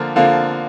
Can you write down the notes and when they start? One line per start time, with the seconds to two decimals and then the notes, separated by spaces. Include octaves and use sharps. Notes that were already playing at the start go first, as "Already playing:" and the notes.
Already playing: D3 F3 A#3 F4
0.16 D3 F3 A#3 F4